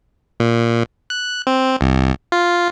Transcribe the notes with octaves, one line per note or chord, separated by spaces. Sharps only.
A#2
F#6
C4
C2
F4